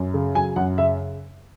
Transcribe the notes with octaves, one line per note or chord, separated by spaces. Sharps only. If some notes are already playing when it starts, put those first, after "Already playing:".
Already playing: F#2
C#3
F#3 G#5
F#2 F#5
C#3 E5